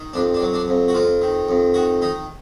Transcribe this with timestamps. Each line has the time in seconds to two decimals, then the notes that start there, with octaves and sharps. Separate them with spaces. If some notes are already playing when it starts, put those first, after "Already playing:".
Already playing: D#3
0.13 F2 D4
0.34 D4
0.41 F#3
0.54 D4
0.68 F2
0.88 F#4
0.94 F2 F4
1.22 D#3
1.49 F2
1.74 D#3 F#4
2.02 D#3 D#4